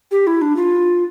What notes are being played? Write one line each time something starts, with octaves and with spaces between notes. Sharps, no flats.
G4
E4
D4
F4